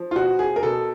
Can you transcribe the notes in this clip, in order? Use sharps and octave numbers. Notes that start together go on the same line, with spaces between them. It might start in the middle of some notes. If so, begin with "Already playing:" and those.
Already playing: F3
F4
B2 F#4
G#4
A#4
B2 A4